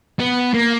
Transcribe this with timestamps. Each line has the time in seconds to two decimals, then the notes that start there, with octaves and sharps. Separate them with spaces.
0.19 B3
0.54 A#3